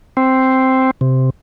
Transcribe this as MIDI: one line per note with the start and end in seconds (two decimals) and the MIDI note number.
0.17 0.91 60
1.01 1.30 48